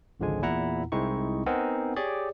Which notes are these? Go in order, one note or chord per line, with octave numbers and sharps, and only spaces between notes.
G#1 C#2 D3 F3 G#3 G#5
E2 A#2 E4 F#5 A#5
C2 G#3 C4 D#4 E4 C#6
B3 C4 D#4 A#4 F#5 G#5
G4 G#4 C#5 D5